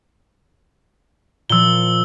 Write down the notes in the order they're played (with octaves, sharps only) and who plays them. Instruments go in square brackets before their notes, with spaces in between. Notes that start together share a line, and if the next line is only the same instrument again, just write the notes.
[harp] A#2 F3 [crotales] E6 G7